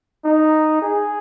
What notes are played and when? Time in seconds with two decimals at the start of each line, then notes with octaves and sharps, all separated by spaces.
0.24 D#4
0.82 G#4